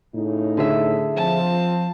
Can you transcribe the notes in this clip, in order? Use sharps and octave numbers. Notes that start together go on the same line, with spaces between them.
A2 C#3 D#4
D3 G#4 E5
F3 C4 F4 A5